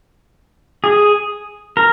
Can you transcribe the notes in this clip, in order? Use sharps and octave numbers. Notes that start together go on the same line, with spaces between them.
G#4
A#4